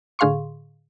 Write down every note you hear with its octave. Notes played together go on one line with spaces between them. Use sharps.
A2 D3 G#4 F5 C6 C#6